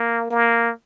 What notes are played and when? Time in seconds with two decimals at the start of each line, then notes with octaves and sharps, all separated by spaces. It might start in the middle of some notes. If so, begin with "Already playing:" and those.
Already playing: A#3
0.30 A#3